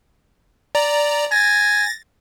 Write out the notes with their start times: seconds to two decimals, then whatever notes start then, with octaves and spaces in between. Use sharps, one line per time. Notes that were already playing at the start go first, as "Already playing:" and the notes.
0.75 D5 A#5
1.32 G#5 A6 A#6